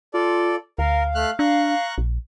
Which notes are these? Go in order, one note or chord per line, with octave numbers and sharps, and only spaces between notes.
F4 A4 D5
D2 A#4 F5
A3 F6 F#6
D4 A#5 C#6 F#6
A#1